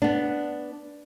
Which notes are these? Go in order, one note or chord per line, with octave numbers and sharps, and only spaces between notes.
B3 D4